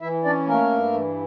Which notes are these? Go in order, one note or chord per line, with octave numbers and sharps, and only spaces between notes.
E3 E4 E5
C#4 D4 D5
A3 A#3 A#4
G2
E3